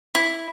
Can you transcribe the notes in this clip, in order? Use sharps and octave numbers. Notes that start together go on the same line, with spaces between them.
E4